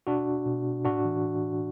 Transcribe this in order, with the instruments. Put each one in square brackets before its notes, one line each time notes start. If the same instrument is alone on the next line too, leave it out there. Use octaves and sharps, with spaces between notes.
[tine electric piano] B2 D4 F#4
B2
A2 D4 F#4
E3